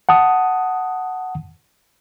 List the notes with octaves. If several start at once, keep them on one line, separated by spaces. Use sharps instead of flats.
F#5 A5 D#6